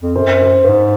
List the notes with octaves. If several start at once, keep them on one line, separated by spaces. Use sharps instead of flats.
F2
F#2 C5
C5
G2
G#2